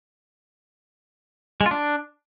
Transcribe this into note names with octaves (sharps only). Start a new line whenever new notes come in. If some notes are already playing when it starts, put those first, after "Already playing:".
G#3
F4
D4